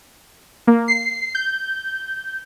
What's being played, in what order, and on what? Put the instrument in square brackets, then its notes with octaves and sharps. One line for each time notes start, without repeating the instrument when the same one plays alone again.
[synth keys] A#3
C7
G6